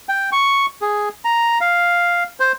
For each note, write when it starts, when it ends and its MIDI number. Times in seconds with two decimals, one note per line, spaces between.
0.09 0.30 79
0.32 0.66 85
0.82 1.09 68
1.25 1.58 82
1.61 2.24 77
2.40 2.52 72